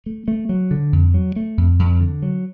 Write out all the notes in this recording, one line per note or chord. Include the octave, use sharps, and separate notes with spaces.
A3
A3
F#3
D3
F2
F#3
A3
F2
F2
D3
F#3